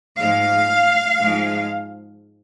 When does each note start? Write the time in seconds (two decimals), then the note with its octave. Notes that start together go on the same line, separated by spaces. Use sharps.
0.18 G#2 F3 G#3 F5
1.21 G#2 F3 G#3